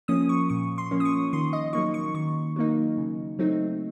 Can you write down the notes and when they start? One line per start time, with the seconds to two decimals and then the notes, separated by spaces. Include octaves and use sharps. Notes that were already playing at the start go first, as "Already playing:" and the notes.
0.08 F3 A#3 C#4 D#6
0.29 C#6
0.50 A#2 C#6
0.78 C6
0.91 F3 A#3 C#4
1.00 D#6
1.05 C#6
1.33 D#3 C6
1.53 D#5
1.73 F#3 A#3 D#4 C#6
1.94 C#6
2.14 D#3 C#6
2.56 F#3 A#3 D#4
2.98 C#3
3.39 F#3 A3 C4 D#4